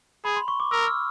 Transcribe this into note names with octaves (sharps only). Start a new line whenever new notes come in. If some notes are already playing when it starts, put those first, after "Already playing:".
G#4 B5
C6
C#6
D6
A#4 E6
F6